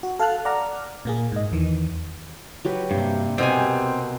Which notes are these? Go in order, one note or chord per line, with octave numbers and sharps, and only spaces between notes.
F#4
A4 F5 A5 F6 F#6
D5 F#5 A#5 F6
A#2 A#3 G#4
G#2 D#5
E2 D#3 E3
F#3 G4 B4
G2 C3 G3 A#3
B2 C4 G4 A#4 C5 G#5